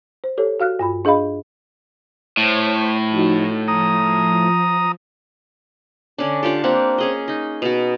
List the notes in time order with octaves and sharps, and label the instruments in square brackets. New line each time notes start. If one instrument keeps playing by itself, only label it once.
[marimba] C5
G4 A4 C#5
F#4 F5 F6 F#6
G2 F4 B5
D4 G#4 D#5 F5 B5
[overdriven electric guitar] A2 [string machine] C5 C#5 B6
[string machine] F3 D#4 F#4
[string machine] F3 [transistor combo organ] A#5 D#6
[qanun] D3 C#4 D4
D4 F4 G4 A4
A#3 C4 G4 F#5
C#4 G#4 D#5
D#4 D#5
B2 F#4